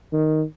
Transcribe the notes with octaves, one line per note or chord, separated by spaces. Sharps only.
D#3